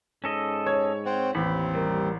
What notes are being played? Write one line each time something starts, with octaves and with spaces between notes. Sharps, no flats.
G#2 C#4 A4 D#5
C#5 G#6
C4 C5 F#5 G5
A1 D#2 C4 B5
G3 A#4